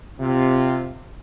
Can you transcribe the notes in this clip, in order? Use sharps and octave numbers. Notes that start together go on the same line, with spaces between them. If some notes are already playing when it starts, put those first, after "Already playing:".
C3 F4